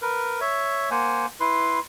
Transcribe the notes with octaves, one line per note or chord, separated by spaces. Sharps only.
A#4 B4
C#5 E5
A#3 C5 F#5 G#5
E4 B4 C6